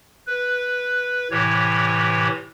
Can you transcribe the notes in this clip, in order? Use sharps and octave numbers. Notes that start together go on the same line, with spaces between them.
B4
A2 C3 E3 C#5